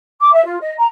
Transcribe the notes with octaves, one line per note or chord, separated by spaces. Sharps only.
D6
E5
F4
D#5
A#5